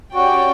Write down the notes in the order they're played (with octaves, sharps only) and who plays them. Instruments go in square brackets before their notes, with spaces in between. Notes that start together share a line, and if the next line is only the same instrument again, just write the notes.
[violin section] C#4 G4 D5 G5 [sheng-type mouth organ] F#4